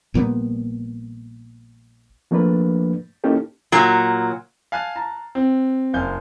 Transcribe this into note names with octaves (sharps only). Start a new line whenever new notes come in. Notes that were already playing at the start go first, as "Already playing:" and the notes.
A#1 A#2 G3 B3
F3 A3 A#3 D4 B4
A#3 C#4 D#4 E4 G4 A4
A#2 F#3
F5 G#5 A5 F#6
A5 A#5
C4
F#1 C5 F5 G#5 G6